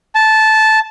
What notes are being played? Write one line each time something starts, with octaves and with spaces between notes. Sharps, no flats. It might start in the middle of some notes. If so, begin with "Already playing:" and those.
A5